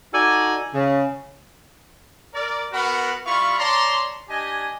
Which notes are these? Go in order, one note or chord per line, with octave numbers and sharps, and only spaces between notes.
D#4 F#4 A4 D5 G#5
C#3
A#4 D5
B3 F#4 A#4 B4 F#5 B5
G3 E4 F4 F5 B5 C#6
C#5 D5 A5 A#5 C6
D4 G4 D#5 G#5